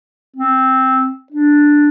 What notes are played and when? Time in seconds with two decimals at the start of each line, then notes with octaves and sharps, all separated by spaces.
0.36 C4
1.32 D4